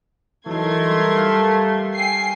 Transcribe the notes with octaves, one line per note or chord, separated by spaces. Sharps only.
E3 F#3 A3 D#4 A#4 C6 G#6
G3
F5
G5 G#5 C7